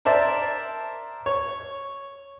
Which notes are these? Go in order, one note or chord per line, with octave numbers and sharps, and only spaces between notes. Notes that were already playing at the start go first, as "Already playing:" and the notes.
A#4 C5 D5 E5 A5
C#5